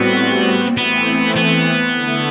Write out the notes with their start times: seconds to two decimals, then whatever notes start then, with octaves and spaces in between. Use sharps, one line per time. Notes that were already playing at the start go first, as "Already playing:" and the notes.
Already playing: A2 G3 B3 C4 F#4
0.77 E3 A3 B3 C4
1.37 B3
1.95 D3 A3 E4